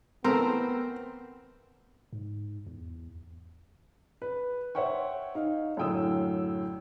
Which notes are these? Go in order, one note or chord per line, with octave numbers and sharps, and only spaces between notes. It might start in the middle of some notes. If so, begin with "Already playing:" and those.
E3 A3 B3 C4 A#4
G#2
E2
B4
C5 C#5 E5 F#5 G5 C#6
D#4 F5
F#2 A2 D3 G5 D#6 E6